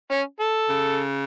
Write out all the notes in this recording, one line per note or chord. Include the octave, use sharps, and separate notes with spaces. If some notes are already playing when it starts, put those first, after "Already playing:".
C#4
A4
C#3